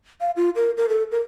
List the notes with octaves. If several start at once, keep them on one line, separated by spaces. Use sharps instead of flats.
F5
F4
A#4
A#4
A4
A#4